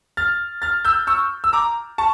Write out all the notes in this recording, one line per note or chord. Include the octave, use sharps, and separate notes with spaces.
F6 A6
F6 A6
E6 G6
C#6 E6
E6
A#5 D6
A5 C#6